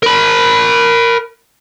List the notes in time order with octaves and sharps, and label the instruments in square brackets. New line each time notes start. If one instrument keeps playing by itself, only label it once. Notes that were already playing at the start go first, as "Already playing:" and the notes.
[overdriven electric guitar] A#4 B5